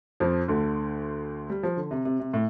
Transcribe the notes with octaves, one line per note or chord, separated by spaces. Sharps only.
F2 F3
D2 D3
G3
F3
D3
C3
C3
C3
A2